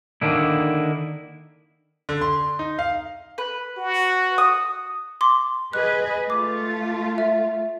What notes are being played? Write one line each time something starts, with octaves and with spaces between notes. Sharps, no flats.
D3 D#3 A#3 D4 E4
D3
C6
D#4
F5
B4
F#4
D#6
C6 D6
G#4 B4 D#5 F#6
A3 F4 D6
E5